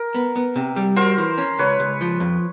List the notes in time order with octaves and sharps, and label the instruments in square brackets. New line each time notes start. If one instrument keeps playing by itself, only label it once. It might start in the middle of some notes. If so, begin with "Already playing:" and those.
Already playing: [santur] A#4
[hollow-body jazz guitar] B3
B3
C3
G3
[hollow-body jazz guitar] F#4 [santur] A#4 C5
[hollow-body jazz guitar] E3
C#4
[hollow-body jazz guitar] C#2 [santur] B4 C#5
[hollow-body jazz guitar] C#2
F3
F2